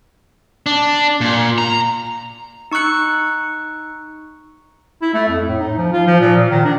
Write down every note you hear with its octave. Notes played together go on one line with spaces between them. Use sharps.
D4
A#2
A#5
D#4 C#6 E6 F#6 C#7
E4
A3
F2
A2
D#4
F3
F4
F3
A#2
A#2
D#3
D4